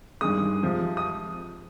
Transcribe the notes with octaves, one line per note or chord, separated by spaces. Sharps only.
G2 D#3 G#3 D#6
C3 F3 G#3
D#6